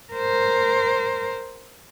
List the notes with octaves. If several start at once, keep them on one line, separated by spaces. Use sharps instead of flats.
A#4 C5